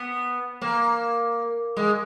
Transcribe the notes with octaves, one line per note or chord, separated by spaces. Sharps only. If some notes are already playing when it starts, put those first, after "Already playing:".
Already playing: B3
A#3
G#3